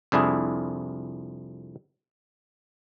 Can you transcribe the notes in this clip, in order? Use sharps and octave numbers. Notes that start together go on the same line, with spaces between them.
C2 F2 D4 E4 G#4